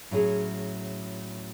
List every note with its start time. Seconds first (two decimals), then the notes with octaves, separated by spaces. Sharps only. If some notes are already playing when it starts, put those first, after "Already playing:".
0.11 A2 F#3 C#4 G#4